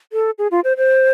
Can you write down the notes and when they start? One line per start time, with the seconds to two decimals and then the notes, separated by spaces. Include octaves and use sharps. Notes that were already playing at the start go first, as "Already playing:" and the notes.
0.13 A4
0.38 G#4
0.51 F4
0.64 C5
0.77 C5